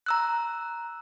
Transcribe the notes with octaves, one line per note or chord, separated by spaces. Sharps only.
A#5 E6 F#6